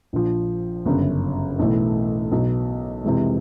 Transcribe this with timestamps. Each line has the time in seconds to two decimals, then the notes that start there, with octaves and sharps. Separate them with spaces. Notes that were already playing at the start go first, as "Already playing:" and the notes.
0.13 A#1 A#2 F3
0.86 G1 F#2 C#3
1.59 B1 A2 E3 A3
2.31 B1 B2 F#3
3.05 F2 C3 E3 G#3